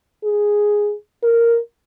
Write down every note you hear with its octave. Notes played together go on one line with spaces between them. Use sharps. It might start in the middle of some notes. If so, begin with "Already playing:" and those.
G#4
A#4